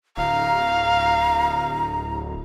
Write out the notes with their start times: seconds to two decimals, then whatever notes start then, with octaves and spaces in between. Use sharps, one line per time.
0.17 D1 F5 A#5